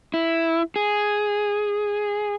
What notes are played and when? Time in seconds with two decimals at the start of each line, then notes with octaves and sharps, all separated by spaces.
0.14 E4
0.76 G#4